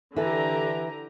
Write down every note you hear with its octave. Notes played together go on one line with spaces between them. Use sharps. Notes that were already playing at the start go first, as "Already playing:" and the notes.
D3 E3 B3 G4 A4 A#5